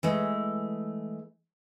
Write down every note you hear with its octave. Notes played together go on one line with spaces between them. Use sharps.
E3 G#3 A3